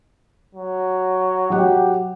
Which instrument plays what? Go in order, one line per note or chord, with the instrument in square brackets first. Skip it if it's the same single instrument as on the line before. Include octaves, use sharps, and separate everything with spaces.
[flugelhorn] F#3
[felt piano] F#3 F#5 [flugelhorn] G4